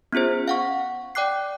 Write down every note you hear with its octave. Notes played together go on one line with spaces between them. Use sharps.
B3 C#4 F4 G#4 C5
F5 F#5 C#6
D5 G5 D6 F#6 C7